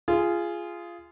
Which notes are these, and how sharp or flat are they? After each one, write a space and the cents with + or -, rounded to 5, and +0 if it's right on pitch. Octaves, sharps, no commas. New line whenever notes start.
F4 -20 G#4 +0